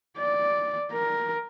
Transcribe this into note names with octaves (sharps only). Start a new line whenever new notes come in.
D5
A#4